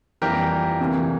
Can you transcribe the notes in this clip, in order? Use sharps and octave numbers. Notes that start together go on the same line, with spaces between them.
F2 E3 G3 A#3 G4 A#4
D2 C3 E3 A#3